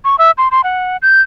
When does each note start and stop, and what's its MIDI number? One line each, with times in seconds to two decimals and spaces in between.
0.05 0.16 85
0.19 0.31 76
0.38 0.48 84
0.52 0.62 84
0.64 0.97 78
1.02 1.21 91